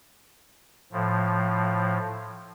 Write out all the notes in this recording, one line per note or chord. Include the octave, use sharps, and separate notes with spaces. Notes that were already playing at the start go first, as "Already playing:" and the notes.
A2 F3